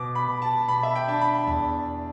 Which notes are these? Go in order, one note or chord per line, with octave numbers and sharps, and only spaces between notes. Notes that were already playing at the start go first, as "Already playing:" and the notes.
Already playing: B2 D6
B5
B2
A5
B2 B5
E5
G5
D4 A5
B5
E2 A5